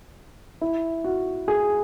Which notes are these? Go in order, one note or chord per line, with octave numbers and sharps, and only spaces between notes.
E4
F#4
G#4